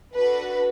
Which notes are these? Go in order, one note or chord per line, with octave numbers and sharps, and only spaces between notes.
D4 F#4 A4 B4